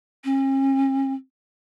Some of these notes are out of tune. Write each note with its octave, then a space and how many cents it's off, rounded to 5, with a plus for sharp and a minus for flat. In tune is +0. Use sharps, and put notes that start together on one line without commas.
C#4 -45